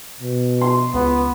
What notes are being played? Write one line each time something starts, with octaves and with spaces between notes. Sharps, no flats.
B2
C6
C#2 B3